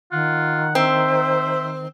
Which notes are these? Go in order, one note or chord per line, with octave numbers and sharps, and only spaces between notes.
D#3 F4 F#5
C4 C5 E5